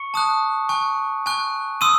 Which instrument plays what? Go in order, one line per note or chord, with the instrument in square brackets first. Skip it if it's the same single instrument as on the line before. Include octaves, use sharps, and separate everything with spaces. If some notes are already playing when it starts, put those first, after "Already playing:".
Already playing: [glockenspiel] C#6 C#7
A5 D#6 F#6
G#5 C#6 F#6
G#5 C#6 F#6
C6 D#6 E6 D#7